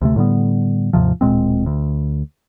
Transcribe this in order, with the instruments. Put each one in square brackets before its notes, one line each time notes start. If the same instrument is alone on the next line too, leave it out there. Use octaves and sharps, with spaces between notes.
[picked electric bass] D2 C3 A3
A2 D3 G3 B3
D#2 G#2 C3 F3
D1 A#2 G#3 C4
D2